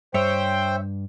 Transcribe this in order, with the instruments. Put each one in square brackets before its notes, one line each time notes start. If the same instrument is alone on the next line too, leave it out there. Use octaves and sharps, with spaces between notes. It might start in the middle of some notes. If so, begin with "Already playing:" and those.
[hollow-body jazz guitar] G2 [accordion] C5 G5 [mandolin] C#5 E5